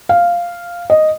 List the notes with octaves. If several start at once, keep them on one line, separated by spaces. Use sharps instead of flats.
F5
D#5